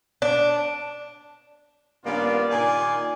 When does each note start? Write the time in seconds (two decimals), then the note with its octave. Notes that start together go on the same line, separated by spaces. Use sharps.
0.22 D4
2.05 G2 C#3 A#3 B3 F4 D5
2.50 A#2 D#3 D5 G#5